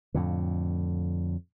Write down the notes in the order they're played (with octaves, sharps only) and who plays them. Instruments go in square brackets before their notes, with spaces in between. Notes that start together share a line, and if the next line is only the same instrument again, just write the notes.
[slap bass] F2 A2 D3